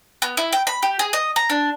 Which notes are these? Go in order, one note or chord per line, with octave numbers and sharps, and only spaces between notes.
B3
E4
G5
B5
G4
G#4
D#5
A#5
D4